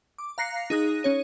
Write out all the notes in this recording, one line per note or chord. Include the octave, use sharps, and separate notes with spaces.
D6
F5 A#5 F#6 A#6 C7 C#7
D#4 G#4 D#6 F#6 A#6
C#4 C#5 D#7